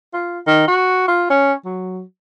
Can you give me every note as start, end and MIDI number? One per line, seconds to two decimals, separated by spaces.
0.13 0.40 65
0.46 0.67 51
0.68 1.03 66
1.08 1.28 65
1.30 1.53 61
1.65 2.02 54